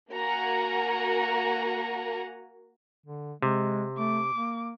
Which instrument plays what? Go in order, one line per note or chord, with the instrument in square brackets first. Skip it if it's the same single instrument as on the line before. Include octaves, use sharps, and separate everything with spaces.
[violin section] A#3 F#4 A#4 F#5 G#5 A#5
[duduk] D3
[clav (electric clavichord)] C3 [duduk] G#3
[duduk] A3 [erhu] D6
[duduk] A#3